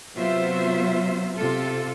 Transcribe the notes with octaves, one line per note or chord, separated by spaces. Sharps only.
C3 F#3 B3 F4 C5 E5
C3 F4 A4